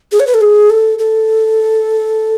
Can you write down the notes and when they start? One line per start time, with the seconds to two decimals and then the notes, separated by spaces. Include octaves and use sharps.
0.12 G#4
0.20 C#5
0.27 B4
0.34 A4
0.41 G#4
0.70 A4
0.99 A4